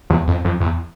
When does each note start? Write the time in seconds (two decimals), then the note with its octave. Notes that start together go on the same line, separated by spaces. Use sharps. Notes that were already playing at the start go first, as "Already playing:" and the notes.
0.10 E2
0.27 F2
0.45 F2
0.60 E2